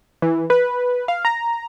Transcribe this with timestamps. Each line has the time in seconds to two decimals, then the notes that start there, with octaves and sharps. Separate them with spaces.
0.22 E3
0.50 B4
1.08 F5
1.25 A#5